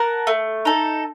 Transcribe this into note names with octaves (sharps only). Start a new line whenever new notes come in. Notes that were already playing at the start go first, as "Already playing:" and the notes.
Already playing: A#4 F#5 A5
A3
D#4 A4